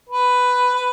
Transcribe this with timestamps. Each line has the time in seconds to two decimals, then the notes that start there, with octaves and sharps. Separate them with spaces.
0.09 B4
0.75 B4